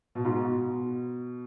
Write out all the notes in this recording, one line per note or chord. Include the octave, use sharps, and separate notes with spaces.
B2
G#2
B2